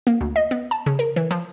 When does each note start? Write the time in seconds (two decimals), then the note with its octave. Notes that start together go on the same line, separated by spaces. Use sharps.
0.07 A#3
0.21 D2
0.36 D#5
0.51 B3
0.71 A5
0.86 C#3
0.99 A#4
1.16 E3
1.31 F3